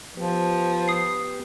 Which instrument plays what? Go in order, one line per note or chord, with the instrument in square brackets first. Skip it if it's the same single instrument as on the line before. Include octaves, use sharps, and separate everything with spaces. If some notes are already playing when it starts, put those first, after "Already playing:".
[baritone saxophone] F3 [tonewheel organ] B3 G4 B4
[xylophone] D#6 C7